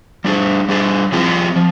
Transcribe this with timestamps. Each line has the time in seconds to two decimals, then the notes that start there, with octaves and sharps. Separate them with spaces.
0.24 G3 D4 G#4
0.68 G3 D4 G#4
1.12 F3 C4 F4 G#4
1.56 F3